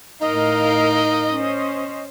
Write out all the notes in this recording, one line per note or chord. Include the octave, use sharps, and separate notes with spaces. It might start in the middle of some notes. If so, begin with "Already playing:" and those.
A2 D#4 A#4 D#5 F5
C#4 C5